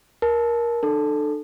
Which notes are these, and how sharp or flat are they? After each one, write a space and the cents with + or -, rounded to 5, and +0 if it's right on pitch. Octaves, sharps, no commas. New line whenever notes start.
A#4 +15 A5 -20
D4 +45 A4 +0 A5 +0